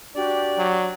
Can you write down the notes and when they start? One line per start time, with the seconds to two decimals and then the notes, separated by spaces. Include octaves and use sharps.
0.14 D4 F#4 G4 D5
0.58 F#3